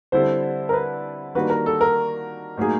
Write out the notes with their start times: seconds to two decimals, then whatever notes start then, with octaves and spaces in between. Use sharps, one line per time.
0.12 D3 G3 C4 E4 A4 C5
0.69 A#4
0.73 B4
1.35 D#3 G3 A#3 D4 F#4 B4
1.50 A#4
1.66 A4
1.81 A#4
2.57 A2 F#3 A#3 D#4 G#4